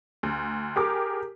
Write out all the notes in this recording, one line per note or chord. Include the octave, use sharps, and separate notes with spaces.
D2
G4 G#4 A#4 D6